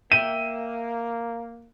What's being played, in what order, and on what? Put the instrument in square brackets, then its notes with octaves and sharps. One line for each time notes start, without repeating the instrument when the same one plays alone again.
[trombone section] A#3 [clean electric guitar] E5 G5 [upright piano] D#7